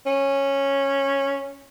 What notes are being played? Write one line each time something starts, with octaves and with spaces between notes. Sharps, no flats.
C#4